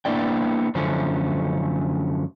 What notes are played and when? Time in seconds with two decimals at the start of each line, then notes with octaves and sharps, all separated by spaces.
0.05 A#3 B3 D4 E4 D5 G5
0.75 F#2 D3 F3 A3 C#4